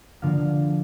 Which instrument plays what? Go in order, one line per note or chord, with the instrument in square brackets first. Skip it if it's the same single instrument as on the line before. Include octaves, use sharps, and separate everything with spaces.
[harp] D3 F3 A#3 F5